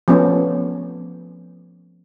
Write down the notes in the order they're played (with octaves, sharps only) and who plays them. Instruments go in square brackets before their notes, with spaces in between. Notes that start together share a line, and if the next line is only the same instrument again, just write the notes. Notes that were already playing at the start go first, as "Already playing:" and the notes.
[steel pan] F3 A3 B3 C#4